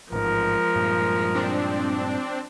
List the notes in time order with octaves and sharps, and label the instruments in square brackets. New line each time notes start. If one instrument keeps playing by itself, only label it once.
[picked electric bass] A1 G#2 [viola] F3 G#3 [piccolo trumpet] A#4
[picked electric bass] G2 A#2
[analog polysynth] C4 D4